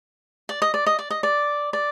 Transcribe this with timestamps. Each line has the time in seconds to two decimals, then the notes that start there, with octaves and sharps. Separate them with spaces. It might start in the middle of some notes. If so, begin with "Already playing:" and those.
0.49 D5
0.62 D#5
0.74 D5
0.86 D#5
0.99 D5
1.10 D#5
1.23 D5
1.73 D5